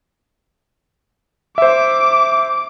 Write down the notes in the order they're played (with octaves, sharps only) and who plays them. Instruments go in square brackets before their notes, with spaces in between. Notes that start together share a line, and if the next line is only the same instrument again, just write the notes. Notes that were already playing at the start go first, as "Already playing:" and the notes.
[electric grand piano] C5 E5 [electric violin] D6